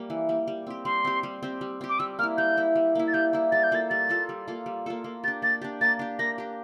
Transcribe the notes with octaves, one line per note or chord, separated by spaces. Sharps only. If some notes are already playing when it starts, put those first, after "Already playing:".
Already playing: G3 A#3
E3
G3 A#3
G3
C4 G4
G3 C6
C4 G4
G3
C4 G4
G3
C4 G4
D6
G3 E6
A#3 E4 F6
G3 G6
A#3 E4
G3
A#3 E4
A6
G3 G6
A#3 E4
G3 A6
G6
A#3 F4 A4 A6
G3 A6
A#3 F4 A4
G3
A#3 F4 A4
G3
A#3 F4 A4
A#3
D4 G4 A6
A#3 A6
D4 G4
A#3 A6
D4 G4
A#3 A#6
D4 G4